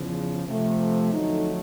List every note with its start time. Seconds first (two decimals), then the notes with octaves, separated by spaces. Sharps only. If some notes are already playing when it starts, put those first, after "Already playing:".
Already playing: E2 C#3 F3
0.46 C3 F3 A3
1.12 F2 D3 F#3 A3 D#4